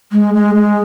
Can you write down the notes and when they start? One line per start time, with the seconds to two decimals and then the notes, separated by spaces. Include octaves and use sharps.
0.12 G#3
0.34 G#3
0.55 G#3